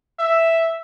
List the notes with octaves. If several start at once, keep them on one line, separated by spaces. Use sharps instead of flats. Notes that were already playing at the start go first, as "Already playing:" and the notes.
E5